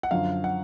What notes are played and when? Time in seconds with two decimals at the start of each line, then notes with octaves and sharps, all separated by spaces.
0.03 F#5
0.11 F#2 D3 F3 F5
0.44 F#5